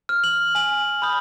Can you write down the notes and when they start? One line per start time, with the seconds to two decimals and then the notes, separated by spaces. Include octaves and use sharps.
0.09 F6
0.24 F#7
0.55 G#5 F#7
1.02 B5 D#6 G6